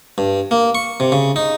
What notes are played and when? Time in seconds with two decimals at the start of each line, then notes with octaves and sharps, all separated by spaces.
0.18 G2
0.51 A#3
0.75 C#6
1.00 C3
1.12 C#3
1.36 D#4